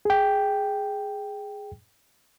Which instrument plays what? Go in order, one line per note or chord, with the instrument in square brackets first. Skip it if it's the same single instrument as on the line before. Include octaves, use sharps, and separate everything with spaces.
[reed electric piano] G#4 G5